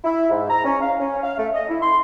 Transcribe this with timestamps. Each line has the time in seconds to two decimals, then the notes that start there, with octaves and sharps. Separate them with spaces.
0.04 E4
0.30 G#2
0.49 A#5
0.64 C#4
0.81 F5
1.00 C#4
1.23 F5
1.37 A3
1.54 D#5
1.69 E4
1.82 C6